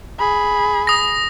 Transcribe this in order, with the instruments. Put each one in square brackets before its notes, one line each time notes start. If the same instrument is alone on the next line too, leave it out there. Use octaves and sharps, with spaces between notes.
[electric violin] G#4 B5
[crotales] D#6 A#6